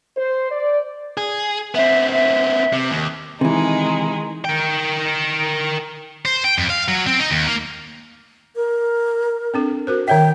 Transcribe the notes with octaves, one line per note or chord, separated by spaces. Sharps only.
C5
D5
G#4
B3 C4 E5
E5
C3
D#2
C3 D#3 E3 G#3 D#4
A#4 G5
C5
G5
F2
F5
F#3
C4
D#4
D#2
A#3
A#4
C4 D4 A4
F#4 A#4 C5
D#3 C#5 E5 G5